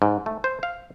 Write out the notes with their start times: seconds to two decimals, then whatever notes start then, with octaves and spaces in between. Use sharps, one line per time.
0.02 G#2
0.26 A3
0.44 C5
0.63 F5